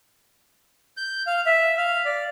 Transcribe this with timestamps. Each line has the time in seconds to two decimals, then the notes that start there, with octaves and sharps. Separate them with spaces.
0.97 G6
1.27 F5
1.46 E5
1.77 F5
2.05 D5